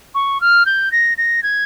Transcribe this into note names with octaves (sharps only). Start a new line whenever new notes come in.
C#6
F6
G6
A#6
A#6
G#6